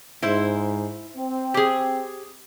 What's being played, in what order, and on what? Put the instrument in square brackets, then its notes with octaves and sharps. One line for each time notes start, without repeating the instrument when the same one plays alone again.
[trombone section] G#2 [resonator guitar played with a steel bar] E4 C5
[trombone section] C4
[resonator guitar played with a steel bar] G4 G#4